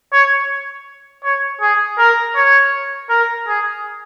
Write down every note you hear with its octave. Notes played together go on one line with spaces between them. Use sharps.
C#5
C#5
G#4
A#4
C#5
A#4
G#4